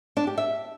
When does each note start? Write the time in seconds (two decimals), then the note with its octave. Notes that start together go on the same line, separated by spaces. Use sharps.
0.17 D4
0.27 G4
0.38 E5